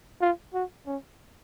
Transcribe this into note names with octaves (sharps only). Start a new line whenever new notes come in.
F4
F#4
C#4